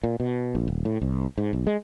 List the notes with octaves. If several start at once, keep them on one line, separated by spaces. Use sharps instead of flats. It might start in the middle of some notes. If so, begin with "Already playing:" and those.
A#2
B2
A#1
D#1
A2
C2
G#2
B1
G#3